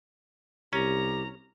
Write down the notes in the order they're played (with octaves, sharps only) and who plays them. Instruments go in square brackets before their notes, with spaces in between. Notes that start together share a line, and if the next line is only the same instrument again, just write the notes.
[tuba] C2 [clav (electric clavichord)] C#4 [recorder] G4 [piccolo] A#5